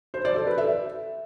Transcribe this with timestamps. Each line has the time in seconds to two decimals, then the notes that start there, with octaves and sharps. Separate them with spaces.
0.14 C5
0.25 D5
0.36 A4
0.47 B4
0.58 E5